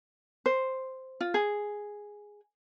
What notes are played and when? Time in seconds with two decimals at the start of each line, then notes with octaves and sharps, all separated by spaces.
0.46 C5
1.21 F4
1.34 G#4